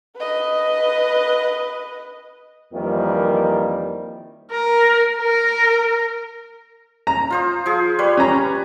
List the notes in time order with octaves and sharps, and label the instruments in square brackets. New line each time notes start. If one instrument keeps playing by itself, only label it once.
[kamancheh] B4 D#5
[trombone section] F2 D#3 E3 G3 A#3
[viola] A#4
A#4
[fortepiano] A#5
[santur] F4 C5 D#6
F3 G#4
G3 B4 C#5
[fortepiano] C#4 A#5